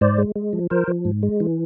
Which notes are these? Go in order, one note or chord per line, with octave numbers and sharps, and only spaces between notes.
G#2 C5 D5
G#3
G#3
F3
F3 A#4 C5
F3
G#2
G#3
E3